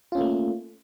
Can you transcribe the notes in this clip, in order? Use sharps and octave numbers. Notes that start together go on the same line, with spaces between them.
A3 A#3 C#4 F4